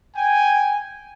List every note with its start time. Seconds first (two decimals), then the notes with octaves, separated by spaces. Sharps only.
0.15 G5 G#5